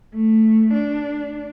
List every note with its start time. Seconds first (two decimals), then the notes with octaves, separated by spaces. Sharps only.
0.14 A3
0.73 D4